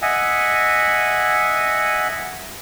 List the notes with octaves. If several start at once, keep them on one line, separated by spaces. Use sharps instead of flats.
D#5 E5 F#5 G#5